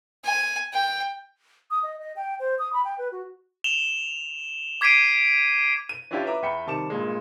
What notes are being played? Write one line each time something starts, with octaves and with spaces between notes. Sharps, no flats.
G#5
G5
D#6
D#5
D#5
G5
C5
D#6
B5
G5
B4
F#4
E7 F7 G7
D6 G#6 B6 C7 D7 D#7
D#7
C#4 D4 E4 F4 G4 C#5
B4 E5 A#5 D6
E2 E5 G5 B5 C#7
C3 D#3 G3 A5 D6 E7
G2 A#2 G#3